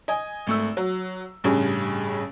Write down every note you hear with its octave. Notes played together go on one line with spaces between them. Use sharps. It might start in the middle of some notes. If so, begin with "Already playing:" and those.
D#5 G#5
G#1 A3 E6
F#3
A1 G2 C#3 G#4